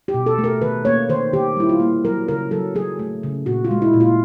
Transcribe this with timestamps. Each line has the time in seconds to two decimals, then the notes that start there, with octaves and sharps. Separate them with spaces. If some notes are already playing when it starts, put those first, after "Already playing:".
0.08 G4
0.14 B2
0.26 A4
0.38 A3
0.44 A#4
0.62 D#3 B4
0.85 A#3 C#5
1.09 D#3 C5
1.33 D#3 G4
1.57 G3 E4
1.69 F4
1.80 A#3
2.04 F#3 A#4
2.28 C#3 A#4
2.51 F#3 A4
2.75 F#3 G#4
2.99 A3
3.23 C#3
3.46 A#2 F#4
3.65 F4
3.71 G#3
3.82 E4
3.94 A#2
4.00 F4